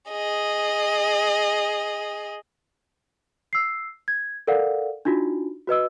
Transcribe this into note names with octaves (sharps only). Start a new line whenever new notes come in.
G#4 D#5
E6 C7
G#6
A4 A#4 D5 F5 F#5
D4 D#4 F4 F#4
F#4 B4 D#5 E6